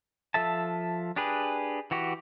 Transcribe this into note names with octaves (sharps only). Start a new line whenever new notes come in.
F3 A4 E5 A5
D4 G4 G#4 B4
E3 F#4 G4